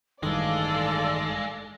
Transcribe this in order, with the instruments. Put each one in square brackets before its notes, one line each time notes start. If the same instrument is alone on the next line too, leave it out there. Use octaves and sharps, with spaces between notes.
[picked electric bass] A1 G2 D#3 [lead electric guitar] G#3 [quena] A4 [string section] D5 F5